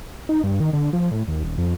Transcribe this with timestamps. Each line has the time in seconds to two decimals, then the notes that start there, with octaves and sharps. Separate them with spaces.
0.29 D#4
0.43 G2
0.60 D#3
0.73 D3
0.93 F3
1.11 A2
1.28 D#2
1.44 D#1
1.58 F2